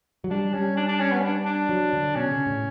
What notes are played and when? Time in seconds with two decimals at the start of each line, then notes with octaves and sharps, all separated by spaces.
0.24 F#3
0.31 G3 D4
0.54 G3 C#4
0.77 D4
0.88 D4
1.00 C#4
1.12 B3
1.23 D4
1.46 D4
1.69 F#3
1.93 D3
2.16 B2 C#4
2.32 C#3
2.47 A2